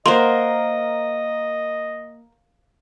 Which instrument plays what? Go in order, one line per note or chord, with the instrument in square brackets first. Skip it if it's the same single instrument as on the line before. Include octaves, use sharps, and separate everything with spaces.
[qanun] A#3 C5 [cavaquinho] A#4 F#5 [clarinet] D#5 [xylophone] C6